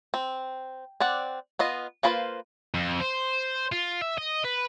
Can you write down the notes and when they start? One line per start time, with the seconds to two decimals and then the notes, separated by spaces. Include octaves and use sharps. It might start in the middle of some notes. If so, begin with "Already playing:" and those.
0.14 C4
1.00 C4 D5 F#5
1.59 B3 F4 D#5
2.03 A#3 F4 B4 C5 F5
2.74 F2
3.01 C5
3.72 F4
4.01 E5
4.18 D#5
4.45 B4